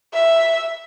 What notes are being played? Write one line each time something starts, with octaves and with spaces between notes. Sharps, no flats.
E5